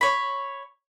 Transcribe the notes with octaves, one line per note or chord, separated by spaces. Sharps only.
C#5 B5